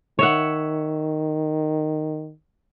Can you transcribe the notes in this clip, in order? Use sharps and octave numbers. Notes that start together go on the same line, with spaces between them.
D#3 C#5 E5 F#5